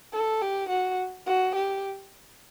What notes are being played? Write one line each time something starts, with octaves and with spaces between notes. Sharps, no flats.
A4
G4
F#4
F#4
G4